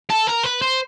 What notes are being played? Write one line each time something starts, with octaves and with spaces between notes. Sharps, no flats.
A4
A#4
B4
C5